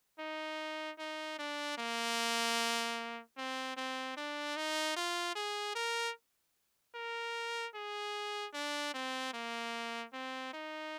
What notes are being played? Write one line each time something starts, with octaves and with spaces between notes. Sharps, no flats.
D#4
D#4
D4
A#3
C4
C4
D4
D#4
F4
G#4
A#4
A#4
G#4
D4
C4
A#3
C4
D#4